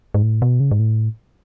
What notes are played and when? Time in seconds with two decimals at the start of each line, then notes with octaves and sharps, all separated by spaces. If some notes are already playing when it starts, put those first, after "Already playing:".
0.14 G#2
0.23 A2
0.42 B2
0.60 C#3
0.71 G#2
0.79 A2